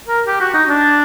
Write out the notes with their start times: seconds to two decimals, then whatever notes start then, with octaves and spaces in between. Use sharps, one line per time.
0.08 A#4
0.27 G4
0.41 F#4
0.54 D#4
0.69 D4